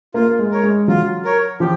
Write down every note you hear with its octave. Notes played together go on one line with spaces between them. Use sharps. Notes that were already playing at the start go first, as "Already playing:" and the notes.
A#3 F4
G#3
A#4 C#5
G#3
F#3 F4
A#4 C#5
F3 G4